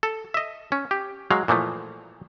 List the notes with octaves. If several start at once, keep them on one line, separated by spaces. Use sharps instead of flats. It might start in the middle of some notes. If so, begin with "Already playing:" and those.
A4
D#5 E5
C#4
G4
F#3 G#3 F5
A#2 E3 F3 A3